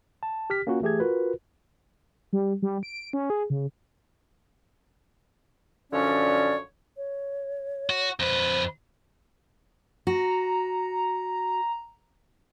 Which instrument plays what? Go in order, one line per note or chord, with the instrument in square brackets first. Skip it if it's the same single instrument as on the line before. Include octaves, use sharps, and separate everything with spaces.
[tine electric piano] A5
G4 F6 B6
A#3 C#4 F4 F#4 A#4
E3 A3 G4 G#4 G#6
F4 F#4 A#4 B4
[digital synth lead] G3
G3
D7
C#4
G#4
C#3
[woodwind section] F#2 D3 F3 C#4 C#5 D5
[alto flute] C#5
[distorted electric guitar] F#4
[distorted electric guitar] F2 B4 [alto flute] C5
[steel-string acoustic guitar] F#4 [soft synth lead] A#5